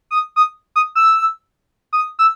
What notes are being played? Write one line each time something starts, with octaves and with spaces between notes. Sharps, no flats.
D#6
D#6
D#6
E6
D#6
E6